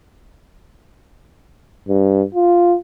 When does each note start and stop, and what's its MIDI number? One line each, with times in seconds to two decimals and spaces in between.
1.89 2.23 43
2.35 2.76 65